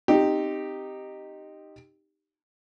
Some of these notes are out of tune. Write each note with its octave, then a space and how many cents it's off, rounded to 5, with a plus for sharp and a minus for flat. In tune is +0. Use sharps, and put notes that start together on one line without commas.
C4 +0 D#4 -10 G4 +0